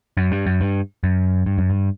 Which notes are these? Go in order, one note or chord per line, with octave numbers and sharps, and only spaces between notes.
F#2
G2
F#2
G2
F#2
G2
F#2
G2